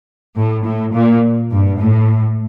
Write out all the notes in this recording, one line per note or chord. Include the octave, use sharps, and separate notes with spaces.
A2
A2
A#2
G2
A2